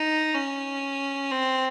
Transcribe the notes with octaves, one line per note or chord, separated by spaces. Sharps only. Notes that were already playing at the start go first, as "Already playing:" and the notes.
Already playing: D#4
C#4
C4